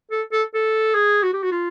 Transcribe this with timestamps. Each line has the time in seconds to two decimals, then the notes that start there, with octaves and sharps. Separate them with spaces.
0.11 A4
0.32 A4
0.54 A4
0.94 G#4
1.23 F#4
1.33 G4
1.43 F#4
1.52 F4